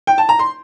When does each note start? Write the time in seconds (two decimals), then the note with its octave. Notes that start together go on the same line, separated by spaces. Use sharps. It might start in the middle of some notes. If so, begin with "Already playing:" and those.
0.07 G5
0.18 A5
0.29 A#5
0.39 C6